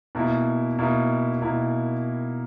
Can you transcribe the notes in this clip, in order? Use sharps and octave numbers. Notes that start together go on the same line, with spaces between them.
B2 A#3 E4
B2 A#3 E4
B2 A#3 E4